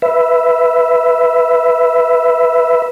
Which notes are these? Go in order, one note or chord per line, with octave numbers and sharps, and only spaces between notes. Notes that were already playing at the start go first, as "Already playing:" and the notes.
B4 E5